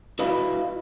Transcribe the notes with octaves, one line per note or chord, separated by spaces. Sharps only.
E4 F#4 B4 D#5 F5 B5